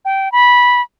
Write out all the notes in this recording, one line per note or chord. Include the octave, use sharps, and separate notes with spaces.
G5
B5